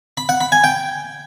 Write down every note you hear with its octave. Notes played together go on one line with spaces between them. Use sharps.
B5
F#5
B5
G#5
G5